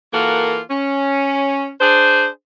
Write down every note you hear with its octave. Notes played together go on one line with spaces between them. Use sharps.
E3 A#3 F4 F#4 A4 A#4
C#4
D4 G#4 C5